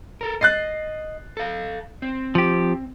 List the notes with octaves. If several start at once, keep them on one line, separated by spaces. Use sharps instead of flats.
A4 A#4
D#5 F#6 A6 C7
A4 F5
C4
F3 G4